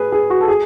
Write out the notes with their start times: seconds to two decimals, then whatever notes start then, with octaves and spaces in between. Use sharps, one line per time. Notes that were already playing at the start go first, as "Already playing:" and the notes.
Already playing: G#4 B4
0.12 G#4
0.30 F#4
0.41 A4
0.48 G#4